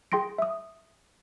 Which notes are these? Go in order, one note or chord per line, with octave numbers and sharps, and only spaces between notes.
G#4 G5 C6 A#6 D7
E5 D#6